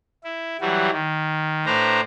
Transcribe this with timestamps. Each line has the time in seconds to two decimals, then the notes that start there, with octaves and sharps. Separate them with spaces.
0.24 E4
0.61 E3 F#3 G3 F#4
0.92 D#3
1.66 A2 D4 B4 C5 A#5